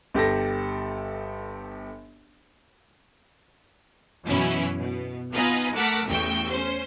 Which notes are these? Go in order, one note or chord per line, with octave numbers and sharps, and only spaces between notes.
G1 G4 A4 A#6
F#2 B2 E3 C#4 E4
B2
B3 D#4 F4 B4 D#5 G#5
A3 A#4 F#5 A5 D6 B6
A1 E2 E3 G5 C#6 E6
C#4 C5